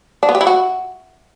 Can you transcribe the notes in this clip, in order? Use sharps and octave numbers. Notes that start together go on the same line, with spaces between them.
D4
B3
G4
E4
F#4